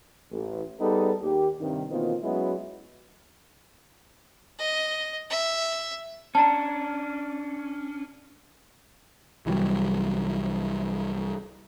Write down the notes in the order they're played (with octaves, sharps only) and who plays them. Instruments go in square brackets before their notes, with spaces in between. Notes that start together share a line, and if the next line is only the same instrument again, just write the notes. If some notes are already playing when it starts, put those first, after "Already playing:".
[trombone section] A1
G3 B3 D#4 G#4 A4
D#2 G4
G2 C3 D#3
B2 D#3 E3 A#3 C4 F4
F#3 G#3 B3 C#4 E4 F#4
[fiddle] D#5
E5
[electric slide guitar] C#4 D4 [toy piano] A5 A#5
[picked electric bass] C2 E3 F#3 G3